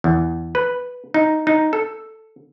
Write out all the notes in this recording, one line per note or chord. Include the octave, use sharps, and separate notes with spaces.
E2
B4
D#4
D#4
A4